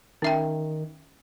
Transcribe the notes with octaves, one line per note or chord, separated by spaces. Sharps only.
D#3 C#4 E5 G5